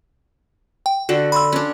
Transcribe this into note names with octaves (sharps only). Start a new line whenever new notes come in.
G5
D3 F#4 A4
B5 C6 E6
C#4 D4